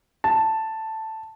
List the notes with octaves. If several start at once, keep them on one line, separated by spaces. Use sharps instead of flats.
A5